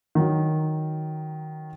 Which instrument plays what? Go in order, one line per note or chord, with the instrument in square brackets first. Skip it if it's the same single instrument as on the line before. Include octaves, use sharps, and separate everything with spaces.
[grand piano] D#3 F#3